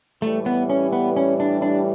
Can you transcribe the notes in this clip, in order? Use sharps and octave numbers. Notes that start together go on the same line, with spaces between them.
A2 E3 G3 A3
B3
C#4
B3
C#4
D4
D4